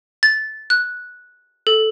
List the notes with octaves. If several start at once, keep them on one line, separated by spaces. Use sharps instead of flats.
A6
F#6
A4